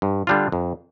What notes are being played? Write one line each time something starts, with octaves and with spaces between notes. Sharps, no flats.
G2
D3 G3 D4 F4
F2